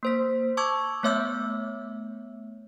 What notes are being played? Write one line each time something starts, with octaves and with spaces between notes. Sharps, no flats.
A#3 C5 B6
A5 C#6 D6 E6 G#6
A3 B3 C#5 E5 E6 G6